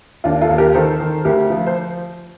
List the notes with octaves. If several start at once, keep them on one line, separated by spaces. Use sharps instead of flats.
D#2 D4 F4
F4 A4
D#2
G4 A#4
D#3 A4 C5
D#3
D2 G4 A#4
F3
C5